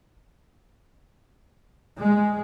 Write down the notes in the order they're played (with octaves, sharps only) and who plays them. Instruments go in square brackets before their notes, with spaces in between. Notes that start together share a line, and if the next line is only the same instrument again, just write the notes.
[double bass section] G#3